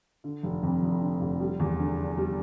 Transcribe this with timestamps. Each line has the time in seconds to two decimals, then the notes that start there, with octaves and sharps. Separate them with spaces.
0.24 D3
0.43 F1
0.63 F2
0.82 F1
1.01 D3
1.21 F1
1.40 G3
1.59 E2
1.79 D3
1.98 D4
2.17 G3